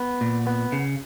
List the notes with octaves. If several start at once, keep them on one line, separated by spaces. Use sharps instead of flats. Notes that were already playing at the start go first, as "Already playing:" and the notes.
Already playing: B3
A#2
B3
C#3